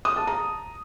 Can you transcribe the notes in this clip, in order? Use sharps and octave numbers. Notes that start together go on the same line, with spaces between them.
D#6
A5
A#5